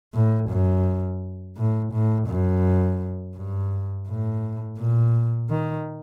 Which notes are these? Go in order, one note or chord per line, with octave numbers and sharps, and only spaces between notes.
A2
F#2
A2
A2
F#2
G2
A2
A#2
D#3